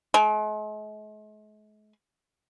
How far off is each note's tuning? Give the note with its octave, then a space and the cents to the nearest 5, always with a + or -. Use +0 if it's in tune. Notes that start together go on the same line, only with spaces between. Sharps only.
G#3 +45